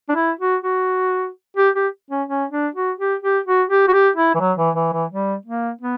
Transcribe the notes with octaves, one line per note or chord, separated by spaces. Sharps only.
D4
E4
F#4
F#4
G4
G4
C#4
C#4
D4
F#4
G4
G4
F#4
G4
F#4
G4
E4
E3
F#3
E3
E3
E3
G3
A#3
B3